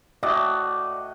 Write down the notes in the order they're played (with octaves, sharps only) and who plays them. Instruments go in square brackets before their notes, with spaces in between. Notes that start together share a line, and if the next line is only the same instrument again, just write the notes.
[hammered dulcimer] A2 F#4 D#5 [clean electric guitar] D5